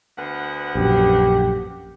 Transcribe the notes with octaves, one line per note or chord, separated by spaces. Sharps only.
D2 B3 F#5
A#1 F#2 G4